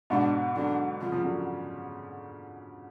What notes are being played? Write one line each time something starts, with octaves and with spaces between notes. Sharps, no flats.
G#2 B2 D4
D3 F#3 D4
C#3 F3 F4
C#3 F3
D3 F#3